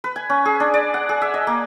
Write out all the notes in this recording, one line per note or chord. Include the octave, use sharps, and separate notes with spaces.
B4
G#5
C#4
G#4
D4
D5
F#5
G#4
E5
D#5
A#3